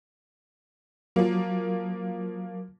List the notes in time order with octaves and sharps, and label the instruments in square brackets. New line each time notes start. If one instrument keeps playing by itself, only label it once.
[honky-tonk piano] F3 A#3 [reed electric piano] F#3